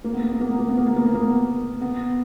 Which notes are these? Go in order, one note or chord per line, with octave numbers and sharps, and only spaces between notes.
A#3
B3
A#3
B3
A#3
B3
A#3
B3
A#3
B3
A#3
B3
A#3
B3